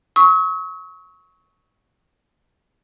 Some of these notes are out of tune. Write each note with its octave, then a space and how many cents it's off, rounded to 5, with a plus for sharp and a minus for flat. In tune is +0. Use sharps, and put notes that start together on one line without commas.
C#6 +0 E6 -45